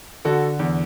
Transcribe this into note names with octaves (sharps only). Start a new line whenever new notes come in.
D3 F#4 A4
E2